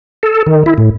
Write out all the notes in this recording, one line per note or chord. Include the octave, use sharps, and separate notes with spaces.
A4
D#3
E4
A2